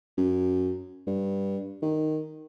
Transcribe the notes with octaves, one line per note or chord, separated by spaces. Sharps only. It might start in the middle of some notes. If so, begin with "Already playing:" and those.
F#2
G2
D#3